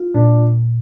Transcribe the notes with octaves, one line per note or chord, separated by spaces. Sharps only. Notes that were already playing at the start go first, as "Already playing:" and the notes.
Already playing: F4
A#2 D4